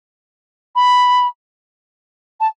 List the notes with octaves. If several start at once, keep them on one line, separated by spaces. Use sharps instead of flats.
B5
A5